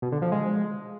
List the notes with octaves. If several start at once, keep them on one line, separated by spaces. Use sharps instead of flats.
B2
D3
F3
G#3